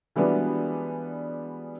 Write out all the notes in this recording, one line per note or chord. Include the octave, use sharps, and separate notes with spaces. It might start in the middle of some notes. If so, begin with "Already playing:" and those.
E3 G3 G#3 B3 D4 F#4